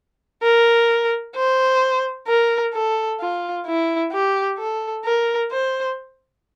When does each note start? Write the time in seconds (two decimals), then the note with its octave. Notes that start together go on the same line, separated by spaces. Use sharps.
0.43 A#4
1.35 C5
2.27 A#4
2.74 A4
3.20 F4
3.66 E4
4.12 G4
4.58 A4
5.05 A#4
5.51 C5